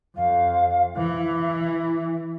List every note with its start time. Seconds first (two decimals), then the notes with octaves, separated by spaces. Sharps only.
0.16 F2 F5
0.97 E3 E5